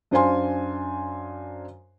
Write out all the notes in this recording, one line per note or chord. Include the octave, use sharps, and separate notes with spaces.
F#2 D4 C5 F5 G#5 C6